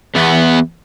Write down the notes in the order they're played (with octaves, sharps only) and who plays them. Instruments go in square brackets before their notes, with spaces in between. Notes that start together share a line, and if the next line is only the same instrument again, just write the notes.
[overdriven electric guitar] E2 B3